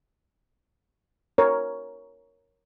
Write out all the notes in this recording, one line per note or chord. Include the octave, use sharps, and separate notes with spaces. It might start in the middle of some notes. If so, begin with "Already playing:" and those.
A#4 C#5